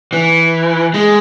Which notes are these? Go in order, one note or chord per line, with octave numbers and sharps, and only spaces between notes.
E3
G#3